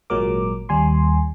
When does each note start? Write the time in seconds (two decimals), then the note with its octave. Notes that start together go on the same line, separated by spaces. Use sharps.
0.10 G#1 A#2 F#3 G#3 A#4 D6
0.69 D#2 G3 G#5 C6